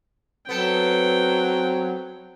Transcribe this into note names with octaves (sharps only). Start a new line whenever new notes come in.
F#3 B3 C4 A4 G5